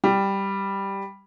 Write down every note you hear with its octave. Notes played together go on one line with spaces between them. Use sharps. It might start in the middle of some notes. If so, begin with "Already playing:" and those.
G3